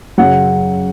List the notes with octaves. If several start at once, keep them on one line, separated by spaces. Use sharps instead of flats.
F#2 C#3 F#3 F#5